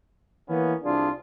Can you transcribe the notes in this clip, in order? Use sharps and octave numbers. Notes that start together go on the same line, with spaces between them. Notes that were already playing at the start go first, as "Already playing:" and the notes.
E3 A#3 B3 C#4
C2 D4 F4 G#4